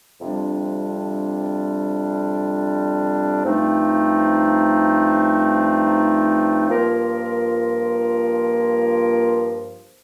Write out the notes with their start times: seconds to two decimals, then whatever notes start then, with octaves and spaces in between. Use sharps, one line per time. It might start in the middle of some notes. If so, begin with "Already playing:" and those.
0.21 F2 C3 G3 D4
3.45 G2 F3 A3 C4 D#4
6.68 G2 F3 A#3 F4 A#4